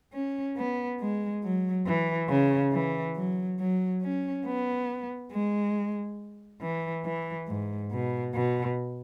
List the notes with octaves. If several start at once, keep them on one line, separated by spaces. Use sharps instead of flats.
C#4
B3
G#3
F#3
E3
C#3
E3
F#3
F#3
C#4
B3
G#3
E3
E3
G#2
B2
B2